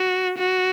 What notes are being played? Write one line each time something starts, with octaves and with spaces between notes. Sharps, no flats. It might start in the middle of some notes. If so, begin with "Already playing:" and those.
Already playing: F#4
F#4